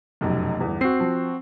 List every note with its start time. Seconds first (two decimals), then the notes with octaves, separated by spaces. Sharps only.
0.21 F1 B1 F#2
0.59 G1 E2
0.81 C4 F#4 C7
1.00 F3